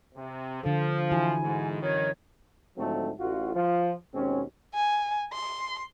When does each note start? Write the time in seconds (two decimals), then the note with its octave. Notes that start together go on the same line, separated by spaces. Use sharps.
0.15 C3
0.63 D3 F3 A4
1.11 E3 E4 F#4 G#5
1.43 G#2
1.82 F#2 D#3 C#5
2.78 G#2 D3 F3 F#3 A3 C4
3.20 A1 F4 F#4
3.54 F3 F4
4.14 D#2 B2 G#3 C4 C#4
4.75 G#5
5.33 C6